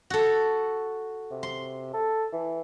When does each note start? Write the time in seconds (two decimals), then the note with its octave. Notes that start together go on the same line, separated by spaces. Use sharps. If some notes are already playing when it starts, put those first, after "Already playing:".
0.10 F#4 A4
1.31 C3
1.43 C6
1.94 A4
2.33 E3